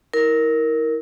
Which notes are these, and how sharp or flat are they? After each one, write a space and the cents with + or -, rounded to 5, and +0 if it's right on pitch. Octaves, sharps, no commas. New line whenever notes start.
E4 -30 A#4 +0